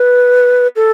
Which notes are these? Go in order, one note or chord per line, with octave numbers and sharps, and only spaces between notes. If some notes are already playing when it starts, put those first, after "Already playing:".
Already playing: B4
A4